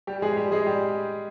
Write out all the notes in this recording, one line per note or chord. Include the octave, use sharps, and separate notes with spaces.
G3 G4
G#3 G#4
G3 G4
G#3 G#4
G3 G4